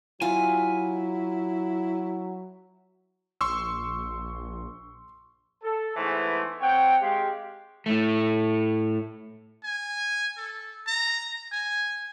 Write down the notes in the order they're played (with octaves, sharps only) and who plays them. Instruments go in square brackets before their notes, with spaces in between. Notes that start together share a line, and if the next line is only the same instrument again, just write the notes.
[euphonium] F#3 [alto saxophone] E4 [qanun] F4 [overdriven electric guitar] G#5
[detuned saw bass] A#1 [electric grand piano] C6 C#6 E6
[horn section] A4
G#2 E3 G#3 A3 B3 C5
C4 C#5 F#5 G5
G#3 G4 F5
[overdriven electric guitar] A2 A3
[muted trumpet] G#5
A4
A#5
G#5